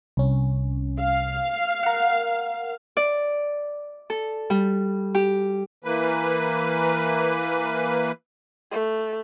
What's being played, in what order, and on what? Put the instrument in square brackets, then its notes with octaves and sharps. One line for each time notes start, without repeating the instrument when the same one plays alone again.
[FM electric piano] C2 C#4
[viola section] F5
[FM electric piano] A#4 F#5
[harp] D5
A4
G3
G4
[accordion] E3 A#3 B4
[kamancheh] A3